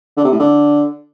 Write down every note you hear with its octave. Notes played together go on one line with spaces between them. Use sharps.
D3
C3
A2
D3